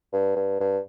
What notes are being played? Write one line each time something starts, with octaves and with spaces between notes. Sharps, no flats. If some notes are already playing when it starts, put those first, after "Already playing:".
G2
G2
G2